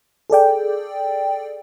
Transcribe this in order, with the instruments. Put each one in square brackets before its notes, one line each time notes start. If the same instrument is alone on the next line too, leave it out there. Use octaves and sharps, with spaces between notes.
[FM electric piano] G#4 A4 D5 G5